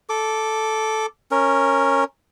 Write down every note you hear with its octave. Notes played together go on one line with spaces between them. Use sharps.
A4 D6
C#4 A#4